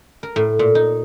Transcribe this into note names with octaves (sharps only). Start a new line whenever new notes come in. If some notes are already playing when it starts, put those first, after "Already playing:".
A#4
A2
A#2
D#4